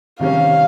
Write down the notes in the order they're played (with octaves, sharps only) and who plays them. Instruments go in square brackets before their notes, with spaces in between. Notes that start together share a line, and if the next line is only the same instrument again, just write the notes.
[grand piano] C3 D#3 G3 C#4 [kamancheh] F5